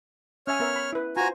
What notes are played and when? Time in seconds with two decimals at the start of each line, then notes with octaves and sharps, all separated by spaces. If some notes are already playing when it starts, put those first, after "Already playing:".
0.47 C#4 C#5 E5 G#5 F6
0.60 B3 A#4 E5
0.76 B5
0.93 E4 B4
1.17 F4 F#4 C5 G#5 A#5